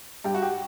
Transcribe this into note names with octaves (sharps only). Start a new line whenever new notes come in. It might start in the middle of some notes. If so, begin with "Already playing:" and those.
G2 G4
F#4
G4